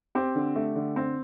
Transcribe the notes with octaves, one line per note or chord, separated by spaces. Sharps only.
C4 G4
D3
A3
D3
C4